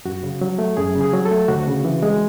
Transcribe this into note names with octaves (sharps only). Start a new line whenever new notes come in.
F#2 F#4
C#3
F#3
A3
F#2 G#4
C#3
G#4
F#3
A4
A3
D2 F#4
C#3
E3
G#3